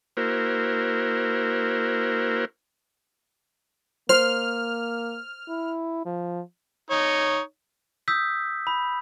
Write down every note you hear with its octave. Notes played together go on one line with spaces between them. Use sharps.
A#3 E4 F#4 A#4 C5
A#3 C5 F6
E4
F3
D#4 C#5
D#6 E6 G6 B6
B5